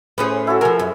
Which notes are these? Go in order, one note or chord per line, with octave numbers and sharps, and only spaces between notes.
A2 C#4 G#4 B4 C5
E4 F#4 A4
F3 G#4 A#4
F#2